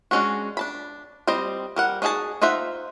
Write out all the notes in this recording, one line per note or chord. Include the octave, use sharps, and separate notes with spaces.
G#3 A3 C#4 D4 F#4
D4 A5 B5
G3 C4 C5 D#5
G3 A#4 F#5
D4 D#4 F#4 G#4 A5
D#4 F4 C5 E5 F#5